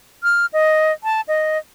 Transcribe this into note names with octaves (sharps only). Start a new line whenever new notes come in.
F6
D#5
A5
D#5